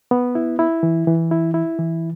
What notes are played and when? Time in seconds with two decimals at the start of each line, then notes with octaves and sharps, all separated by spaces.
0.11 B3
0.35 E4
0.59 E4
0.83 E3
1.07 E3
1.31 E4
1.54 E4
1.79 E3